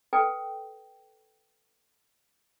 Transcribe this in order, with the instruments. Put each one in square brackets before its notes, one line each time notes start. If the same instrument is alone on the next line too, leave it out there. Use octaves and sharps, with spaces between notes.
[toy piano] A4 B4 G5